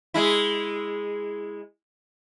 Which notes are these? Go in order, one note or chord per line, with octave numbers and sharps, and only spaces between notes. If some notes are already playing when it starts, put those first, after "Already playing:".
G#3 E4